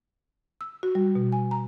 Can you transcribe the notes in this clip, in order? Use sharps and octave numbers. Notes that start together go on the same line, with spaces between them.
E6
F#4
G3
B2
G#5
A#5